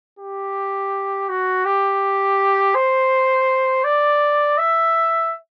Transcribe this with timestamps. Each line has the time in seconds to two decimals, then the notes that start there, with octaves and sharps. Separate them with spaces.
0.19 G4
1.29 F#4
1.65 G4
2.75 C5
3.84 D5
4.58 E5